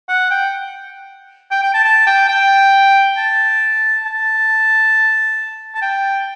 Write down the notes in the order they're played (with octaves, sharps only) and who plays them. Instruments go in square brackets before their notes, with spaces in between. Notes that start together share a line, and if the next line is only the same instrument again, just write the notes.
[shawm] F#5
G5
G5
G5
A5
A5
G5
G5
A5
A5
A5
G5